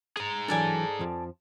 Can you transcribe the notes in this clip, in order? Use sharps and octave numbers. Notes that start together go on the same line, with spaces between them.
G#4 A#5 D#6
E3 F#3 D4 A4 D5 G#5
F2 F3